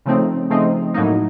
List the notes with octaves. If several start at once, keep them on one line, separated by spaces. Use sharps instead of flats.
C#3 F3 A3 C4 D#4
C#3 F3 A3 C4 D#4
A2 F#3 A#3 D#4